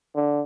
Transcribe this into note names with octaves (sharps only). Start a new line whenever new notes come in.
D3